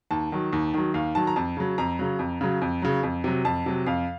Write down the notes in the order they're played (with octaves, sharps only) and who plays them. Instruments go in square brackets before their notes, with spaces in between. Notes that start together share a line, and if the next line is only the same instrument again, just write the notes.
[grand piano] D#2 A5
D#3 F#3
D#2
D#3 F#3
D#2 F5
D#3 F#3 A5
A#5
F2 A5
C#3 F#3
F2 A#5
C#3 F#3
F2
C#3 F#3
F2
C#3 F#3
F2
C3 F#3
F2 A5
C3 F#3
F2 F5